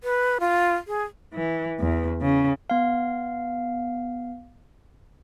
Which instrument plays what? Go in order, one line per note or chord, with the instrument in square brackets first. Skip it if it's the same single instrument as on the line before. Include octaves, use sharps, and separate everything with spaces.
[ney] B4
F4
G#4
[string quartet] E3
E2
C#3
[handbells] B3 F5